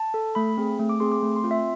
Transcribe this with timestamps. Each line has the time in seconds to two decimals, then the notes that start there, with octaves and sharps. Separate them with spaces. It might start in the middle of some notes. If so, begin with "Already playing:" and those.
Already playing: A5
0.14 A4
0.35 A3 B5
0.57 C4 G#4
0.79 A3
0.89 D6
1.00 C4 G#4 C6
1.12 D6
1.22 A3
1.36 C6
1.44 C4 F4
1.51 E5